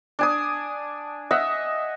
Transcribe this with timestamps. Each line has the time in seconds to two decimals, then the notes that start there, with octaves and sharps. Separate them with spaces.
0.19 D4 G#5 D#6
1.31 D#5 E5 F#5